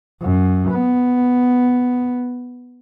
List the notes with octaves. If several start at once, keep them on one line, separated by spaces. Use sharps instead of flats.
F#2
B3